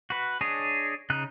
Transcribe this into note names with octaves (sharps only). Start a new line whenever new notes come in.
F#4 B4
D4 G#4 C#5 D#5
C#3 D#4 F#6